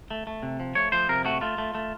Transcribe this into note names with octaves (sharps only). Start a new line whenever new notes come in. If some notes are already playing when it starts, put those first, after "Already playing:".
A3
A3
C3
F3
A3 C#5
F3 C5
C3 A#4
A3 F#4
A3 F4
A3
A3